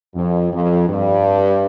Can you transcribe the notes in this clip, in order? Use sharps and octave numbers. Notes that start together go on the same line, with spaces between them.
F2
F2
G2